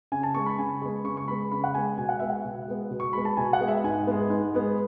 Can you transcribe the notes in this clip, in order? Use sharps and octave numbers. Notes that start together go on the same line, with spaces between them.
C#3 G#5
A5
G#3 B3 C#6
B5
C#3 G#5
G#3 B3 B5
C#3 C#6
C#6
G#3 B3 B5
C#3 B5
F#5
G#3 B3 G#5
B2 G#5
F#5
G#3 B3 E5
F#5
B2
G#3 B3
B2
C#6
G#3 B3 B5
A5
B2 G#5
F#5
G#3 B3
E5
G#2 G#5
G#3 B3
G#2
G#3 B3